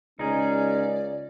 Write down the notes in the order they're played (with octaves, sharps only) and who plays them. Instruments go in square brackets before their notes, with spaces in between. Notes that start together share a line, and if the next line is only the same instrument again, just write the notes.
[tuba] C#2 [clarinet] C#4 [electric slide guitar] D#4 G#4 [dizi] D5